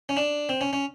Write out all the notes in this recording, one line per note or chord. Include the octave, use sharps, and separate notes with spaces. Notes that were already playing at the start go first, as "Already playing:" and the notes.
C#4
D4
C4
C#4
C#4